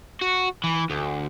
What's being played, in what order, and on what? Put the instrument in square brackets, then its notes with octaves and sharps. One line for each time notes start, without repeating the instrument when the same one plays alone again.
[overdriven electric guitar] F#4
E3
D2